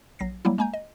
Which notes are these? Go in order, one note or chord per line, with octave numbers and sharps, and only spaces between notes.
A#1 F#3 A#6 C7
F#3 G3 A#3 E4
G#3 A#3 G#5 A#5 G6
D#5